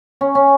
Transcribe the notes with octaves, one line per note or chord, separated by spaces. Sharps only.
C#4
C#4